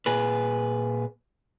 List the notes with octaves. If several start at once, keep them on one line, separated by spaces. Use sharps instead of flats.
A#2 G#4 B4